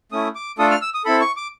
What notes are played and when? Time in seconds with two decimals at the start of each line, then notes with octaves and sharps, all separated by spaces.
0.12 A3 C#4 E4 D#6
0.35 D6
0.58 A3 D4 F4 A4 D#6
0.71 F6
0.82 E6
0.94 D#6
1.05 C4 E4 A4 B5
1.21 C#6
1.37 D6